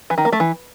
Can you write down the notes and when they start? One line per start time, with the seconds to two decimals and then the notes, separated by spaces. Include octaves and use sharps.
0.10 E3
0.18 D#3
0.25 A#3
0.32 A3
0.40 E3